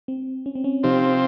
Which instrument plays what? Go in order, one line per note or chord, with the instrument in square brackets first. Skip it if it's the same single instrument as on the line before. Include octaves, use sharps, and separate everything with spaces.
[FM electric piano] C4
C#4
C4
C#4
[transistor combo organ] C3 F3 C4 [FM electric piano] D#4 G4